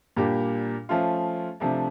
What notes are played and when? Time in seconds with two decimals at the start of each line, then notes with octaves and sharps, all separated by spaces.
0.16 A#2 G3 A#3 D4 G4
0.89 F3 A3 C#4 F4
1.60 C3 F3 A3 D4